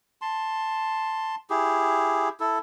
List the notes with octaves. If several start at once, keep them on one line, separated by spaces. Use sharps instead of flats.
A5 C6
E4 G4 G#4
E4 A4